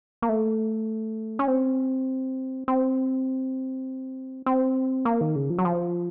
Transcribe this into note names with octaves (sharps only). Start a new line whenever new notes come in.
A#3
A3
C#4
C4
C4
C4
A#3
D#3
C#3
F3
F#3
F3